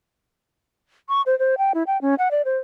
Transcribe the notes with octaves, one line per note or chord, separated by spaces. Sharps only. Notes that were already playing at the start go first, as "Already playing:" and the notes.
C#6
C5
C5
G5
E4
G5
C#4
F#5
D5
C5